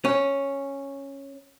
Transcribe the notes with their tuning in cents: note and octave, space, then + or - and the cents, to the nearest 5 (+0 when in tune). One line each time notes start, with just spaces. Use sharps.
C#4 -5